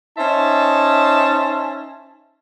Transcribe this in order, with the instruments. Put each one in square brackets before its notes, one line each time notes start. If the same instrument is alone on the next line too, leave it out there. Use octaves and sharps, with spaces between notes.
[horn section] C#4 D#4 C5 E5 A5